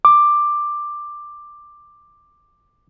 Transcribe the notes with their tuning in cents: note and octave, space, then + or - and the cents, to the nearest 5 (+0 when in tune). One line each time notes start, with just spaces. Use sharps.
D6 +10